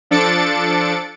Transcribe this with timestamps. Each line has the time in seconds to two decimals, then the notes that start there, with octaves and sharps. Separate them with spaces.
0.11 F3 D4 A4 A6 C#7 D7